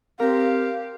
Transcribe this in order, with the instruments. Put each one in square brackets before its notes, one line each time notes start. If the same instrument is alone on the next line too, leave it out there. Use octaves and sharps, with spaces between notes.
[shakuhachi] C4 [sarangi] G4 [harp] A#4 [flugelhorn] F5